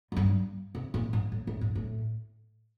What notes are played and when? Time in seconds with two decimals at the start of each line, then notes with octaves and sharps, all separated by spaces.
0.12 F#2
0.16 G2
0.75 C3
0.94 A#2
1.13 G#2
1.32 A2
1.47 A2
1.61 G#2
1.75 A2